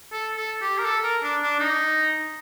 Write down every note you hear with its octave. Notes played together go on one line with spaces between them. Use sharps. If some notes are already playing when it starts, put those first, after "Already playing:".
A4
A4
G4
A#4
A4
A#4
D4
D4
D#4